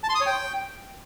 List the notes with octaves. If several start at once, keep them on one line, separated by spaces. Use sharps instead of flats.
A5
C6
D#6
C#5
G5